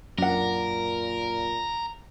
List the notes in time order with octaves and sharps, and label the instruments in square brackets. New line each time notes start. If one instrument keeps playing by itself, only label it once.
[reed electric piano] F#2 [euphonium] A#2 [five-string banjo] D4 F#5 [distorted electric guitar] A#4